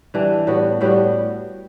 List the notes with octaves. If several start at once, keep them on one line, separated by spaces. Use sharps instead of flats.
E3 G3 D4
A2 G3 B3 F#4
A2 G3 B3 F#4